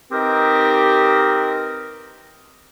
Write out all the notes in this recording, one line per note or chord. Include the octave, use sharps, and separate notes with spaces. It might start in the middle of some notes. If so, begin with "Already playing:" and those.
C4 D#4 G4 A#4 B4